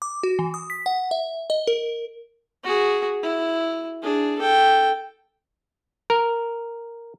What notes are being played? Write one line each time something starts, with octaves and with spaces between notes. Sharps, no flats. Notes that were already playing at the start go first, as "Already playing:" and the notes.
D6
F#4
E3
D#6
B6
F#5
E5
D#5
A#4
F#4 G#4
E4
D4 G#4
A4 G5
A#4